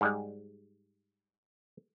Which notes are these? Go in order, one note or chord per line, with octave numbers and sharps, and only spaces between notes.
G#2 G3 G#3